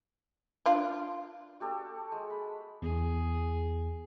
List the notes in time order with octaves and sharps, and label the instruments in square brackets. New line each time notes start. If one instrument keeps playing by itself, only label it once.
[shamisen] D4 F4
[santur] F#4 G4 A4 D5
G#3
B5
[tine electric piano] E2 [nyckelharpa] G#4